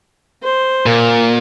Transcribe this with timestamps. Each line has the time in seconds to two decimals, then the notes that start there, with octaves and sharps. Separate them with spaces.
0.43 C5
0.86 A#2 A#4